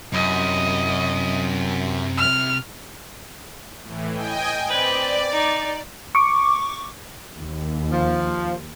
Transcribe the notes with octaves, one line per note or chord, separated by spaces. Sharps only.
F#2 C3 E4 D#5
F6
A2 E3
D#5 G5 G#5
C4 B4 D5
D#4
C#6 D6
D#2
F3